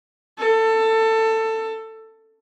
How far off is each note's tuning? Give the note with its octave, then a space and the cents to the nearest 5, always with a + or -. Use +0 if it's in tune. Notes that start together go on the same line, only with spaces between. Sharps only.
A4 +20